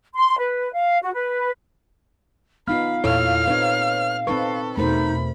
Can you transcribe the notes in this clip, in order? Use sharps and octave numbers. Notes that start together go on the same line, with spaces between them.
C6
B4
F5
F#4
B4
B3 D#4 F4 F5 B5 F6
E2 A#2 E4 A4 C#5 F6
C4 D#4 B4 C#5
C4 D#4 A4 B4 C#6
E2 B2 A3 D#4 A#4 C5 B5